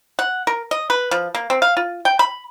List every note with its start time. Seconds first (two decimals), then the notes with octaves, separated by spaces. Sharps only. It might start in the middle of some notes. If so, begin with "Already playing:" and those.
0.19 F#5
0.47 A#4
0.71 D#5
0.90 B4
1.11 F3
1.35 A#3
1.50 C4
1.62 F5
1.77 F4
2.05 G5
2.19 B5